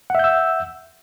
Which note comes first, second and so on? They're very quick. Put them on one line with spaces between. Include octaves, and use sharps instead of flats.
F#5 E5 G6 E6